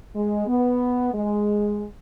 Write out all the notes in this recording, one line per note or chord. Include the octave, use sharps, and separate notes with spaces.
G#3
B3
G#3